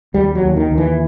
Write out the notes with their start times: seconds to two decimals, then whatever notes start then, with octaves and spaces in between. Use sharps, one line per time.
0.14 D#2 G3
0.35 F#3
0.42 D#2
0.56 D#3
0.71 D#2
0.78 E3